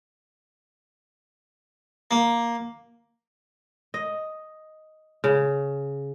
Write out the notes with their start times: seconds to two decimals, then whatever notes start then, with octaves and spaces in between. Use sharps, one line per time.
2.11 A#3
3.94 D#5
5.24 C#3